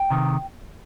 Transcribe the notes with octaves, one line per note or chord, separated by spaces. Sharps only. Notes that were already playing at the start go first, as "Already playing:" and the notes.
Already playing: G5
C3 D#3